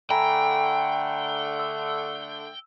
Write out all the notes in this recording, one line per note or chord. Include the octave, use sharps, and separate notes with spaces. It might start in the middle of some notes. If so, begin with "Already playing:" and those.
D3 A3 G5 G#5 A#5 B5
E6